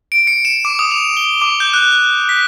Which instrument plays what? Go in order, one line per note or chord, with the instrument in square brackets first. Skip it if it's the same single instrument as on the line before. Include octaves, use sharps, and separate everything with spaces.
[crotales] D7
C#7
E7
D6
D#6
F7
G7
D6
G6
F#6
F#6
B6